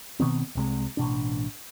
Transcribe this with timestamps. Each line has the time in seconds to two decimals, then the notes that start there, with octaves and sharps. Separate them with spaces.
0.20 B2 D#3 B3 C4
0.55 C2 C3 G#3
0.97 A1 B2 D4